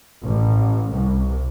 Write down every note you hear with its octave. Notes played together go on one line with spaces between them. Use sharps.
A1
C2